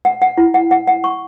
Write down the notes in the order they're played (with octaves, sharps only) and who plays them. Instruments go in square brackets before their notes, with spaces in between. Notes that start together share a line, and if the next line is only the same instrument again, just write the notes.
[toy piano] F#5
F#5
E4
F#5
F#5
F#5
C#6